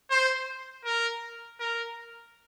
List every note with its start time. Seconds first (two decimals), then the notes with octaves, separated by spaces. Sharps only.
0.10 C5
0.85 A#4
1.60 A#4